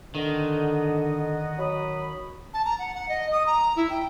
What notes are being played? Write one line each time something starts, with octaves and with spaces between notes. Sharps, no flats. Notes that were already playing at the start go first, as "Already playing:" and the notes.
D3 D#3 D#5 F#5
F#3 B5 D#6
A5
A#5
F#5
F#5
D#5
D#6
A#5
E4
G5